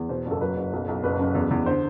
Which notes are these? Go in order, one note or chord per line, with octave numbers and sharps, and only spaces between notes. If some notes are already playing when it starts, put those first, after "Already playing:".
Already playing: E2
B2 C5
F#1
A4
F#3 B4
F#1
B1
B1
F#1 B4
F#2
E2
E2
D3 C5